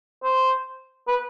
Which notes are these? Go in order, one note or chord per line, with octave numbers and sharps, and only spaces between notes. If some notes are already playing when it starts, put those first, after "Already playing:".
C5
B4